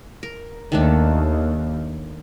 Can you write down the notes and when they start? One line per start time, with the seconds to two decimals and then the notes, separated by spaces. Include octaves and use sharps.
0.23 A#4
0.72 D#2 D#3 A3 D4